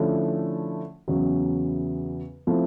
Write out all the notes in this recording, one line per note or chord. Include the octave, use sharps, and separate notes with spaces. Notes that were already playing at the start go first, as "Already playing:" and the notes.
Already playing: D3 F3 A3 C#4 E4
E2 C#3 F#3
F3 A3 C4 E4